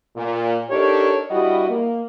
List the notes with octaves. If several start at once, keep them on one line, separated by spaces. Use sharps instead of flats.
A#2
D4 D#4 G4 A4 A#4 C#5
G2 G3 E4 F#4 D#5
A#3